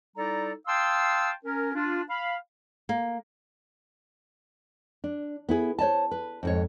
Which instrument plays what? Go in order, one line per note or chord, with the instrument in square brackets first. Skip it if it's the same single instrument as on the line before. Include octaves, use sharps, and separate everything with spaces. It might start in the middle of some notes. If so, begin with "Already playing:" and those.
[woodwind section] G3 D#4 E4 A4 D5 A#5
F5 G5 A5 C6 D#6 E6
C#4 A#4
D4 F4
F5 B5
[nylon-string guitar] A#3
D4
B3 E4 G#4
C5 C#5 D#5 A5
B4
F2 G#2 C#5